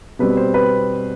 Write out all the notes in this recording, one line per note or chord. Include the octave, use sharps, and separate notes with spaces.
B2 G3 C4 B4
C5
B4